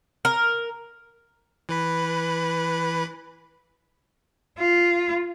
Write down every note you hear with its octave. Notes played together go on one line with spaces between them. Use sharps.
A#4
E3 B4 B5
F4